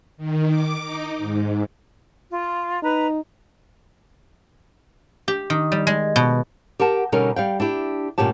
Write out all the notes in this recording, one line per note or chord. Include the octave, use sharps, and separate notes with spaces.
D#3
D6
D#4
G#2
F4
D#4 B4 A#5
G4
D#3
G3
G#3
B2
G4 A#4 F#5 A5
B2 D3 G3 C#4 D#4 A#4
G3 F5 G5
D4 E4 G4
D2 G2 A#2 C#4 G4 A5